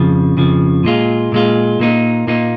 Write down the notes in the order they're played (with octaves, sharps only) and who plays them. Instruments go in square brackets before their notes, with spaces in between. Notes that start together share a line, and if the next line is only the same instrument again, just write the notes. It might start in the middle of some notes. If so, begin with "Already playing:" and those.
Already playing: [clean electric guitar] F2 C#3 F3
F2 C#3 F3
A#2 G#3 F4
A#2 G#3 F4
A#2 A#3 D#4
A#2 A#3 D#4